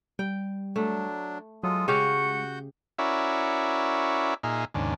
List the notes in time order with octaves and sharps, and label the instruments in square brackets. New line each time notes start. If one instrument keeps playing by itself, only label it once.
[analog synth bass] G3 [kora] G5
[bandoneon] F#3 D4 [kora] A3
[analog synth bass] F#3 [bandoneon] G#3 F4 A4 [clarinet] D#6
[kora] C#3 G4 F5 [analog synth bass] G#3 [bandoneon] F#4 F#5 G6 [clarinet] C#6
[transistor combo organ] C#4 E4 F#4 A#4 D5 E5
A#2 D#4 G#4 E5 F5
D#2 G#2 C#3 D4